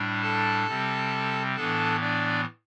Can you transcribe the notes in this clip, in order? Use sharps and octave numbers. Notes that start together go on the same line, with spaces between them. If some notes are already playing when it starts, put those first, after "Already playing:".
Already playing: A2 G3 D4
A4 A5
C3 G3 C4
A2 E3 B3 D4 A4 A5
D4 D5